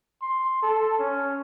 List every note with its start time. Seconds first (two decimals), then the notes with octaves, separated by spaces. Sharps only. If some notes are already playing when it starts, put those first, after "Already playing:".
0.22 C6
0.63 A4
1.00 C#4